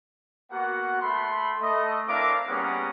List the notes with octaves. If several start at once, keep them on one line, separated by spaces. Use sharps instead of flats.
A#3 B3 F#4 F#5
A3 B5 C6
A3 D#5
C4 D4 E4 A#4 F5 D6
G3 A#3 B3 C#4 G#4 F#5